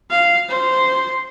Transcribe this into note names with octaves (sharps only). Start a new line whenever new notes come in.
F5
C5